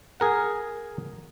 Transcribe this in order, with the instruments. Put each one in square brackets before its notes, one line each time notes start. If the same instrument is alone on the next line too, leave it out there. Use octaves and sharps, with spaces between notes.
[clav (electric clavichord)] G#4 A#4 F#5